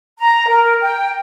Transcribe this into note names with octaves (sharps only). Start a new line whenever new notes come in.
A#5
A#4
G5